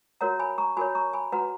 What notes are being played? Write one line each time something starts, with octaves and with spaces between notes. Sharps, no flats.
F#4 A#4 C#5 F#5 A#5
G#5 B5
A#5 C#6
F#4 A#4 C#5 G#5 B5
A#5 C#6
G#5 B5
F#4 B4 F#5 A#5